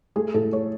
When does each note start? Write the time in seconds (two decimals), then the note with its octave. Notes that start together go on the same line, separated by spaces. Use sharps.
0.16 A3 G#4
0.34 A2 A4
0.52 A3 C#5